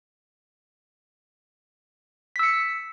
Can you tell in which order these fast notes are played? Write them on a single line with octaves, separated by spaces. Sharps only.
B6 E6 C#7